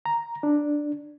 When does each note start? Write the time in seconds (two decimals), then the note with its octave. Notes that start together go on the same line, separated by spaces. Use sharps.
0.06 A#5
0.43 D4